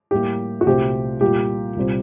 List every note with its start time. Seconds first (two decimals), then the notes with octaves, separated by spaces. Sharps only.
0.11 A2 G3 A#3 G4
0.61 F#4
0.66 C2 A#2 A3 C4 G4
1.21 A#2 G3 A#3 G4
1.76 C2 A#2 G3 C4